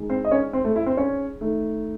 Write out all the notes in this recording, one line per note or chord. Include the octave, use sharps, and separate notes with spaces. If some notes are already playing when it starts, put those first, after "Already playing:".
Already playing: D#3 G#3
C4 C5
D#5
C#4 C#5
C4 C5
A3 A4
E4
C4 C5
C#4 C#5
D#3 A3